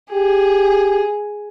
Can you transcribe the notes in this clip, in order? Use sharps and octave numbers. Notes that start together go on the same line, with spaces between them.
G4 G#4